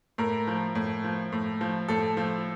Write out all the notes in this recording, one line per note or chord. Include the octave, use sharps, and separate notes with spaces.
A2 A#4
F3
A2
F3
A2
F3
A2 A4
F3